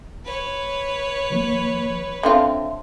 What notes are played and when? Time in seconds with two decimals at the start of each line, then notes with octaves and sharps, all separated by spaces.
0.24 B4 C#5
1.30 D#3 F3 A#3
2.23 D3 C4 F4 E5 A5